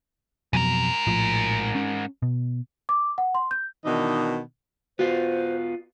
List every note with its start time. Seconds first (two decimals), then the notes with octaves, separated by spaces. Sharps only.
0.53 F2 G#2 B2 F#3 A#4
1.07 A#1 A2 F3
1.75 C#4
2.22 B2
2.89 D6
3.18 F#5
3.35 C6
3.51 G6
3.85 B2 D#3 E3 D4 D#4
4.99 B3 F4 F#4 C5